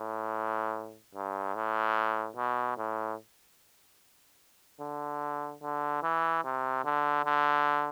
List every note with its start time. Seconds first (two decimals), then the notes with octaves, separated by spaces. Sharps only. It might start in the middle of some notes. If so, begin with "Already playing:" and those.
Already playing: A2
1.15 G2
1.55 A2
2.36 B2
2.78 A2
4.81 D3
5.62 D3
6.03 E3
6.44 C3
6.85 D3
7.25 D3